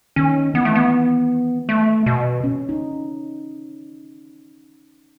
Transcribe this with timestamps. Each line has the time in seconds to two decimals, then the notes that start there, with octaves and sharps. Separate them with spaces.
0.16 D#3 C#4
0.54 E3 B3
0.65 A3
0.75 B3
1.69 A3
2.06 B2
2.44 C#4
2.69 D#4